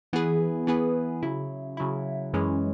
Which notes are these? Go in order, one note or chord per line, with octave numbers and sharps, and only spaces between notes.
E3 B3 G#4 B4
E3 B3 G#4 B4
C#3 F#3 E4
C#3 F#3 E4
F#2 E3 G#3 C#4